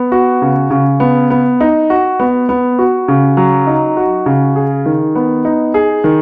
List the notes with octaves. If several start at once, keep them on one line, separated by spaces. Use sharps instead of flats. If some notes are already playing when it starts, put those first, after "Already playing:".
Already playing: B3
F#4
C#3
C#3
B3
B3
D#4
F#4
B3
B3
F#4
C#3
F#3
D#4
F#4
C#3
G#4
D#3
B3
D#4
G#4
D#3